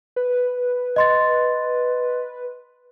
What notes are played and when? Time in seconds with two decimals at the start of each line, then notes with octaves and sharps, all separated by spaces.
0.16 B4
0.96 D#5 C6 A6